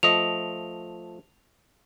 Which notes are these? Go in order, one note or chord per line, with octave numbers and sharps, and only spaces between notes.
F3 A3 D#5 F7